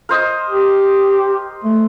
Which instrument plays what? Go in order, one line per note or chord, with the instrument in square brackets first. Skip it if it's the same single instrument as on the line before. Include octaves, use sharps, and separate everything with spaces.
[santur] A#4 C5 D#5
[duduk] G4
A3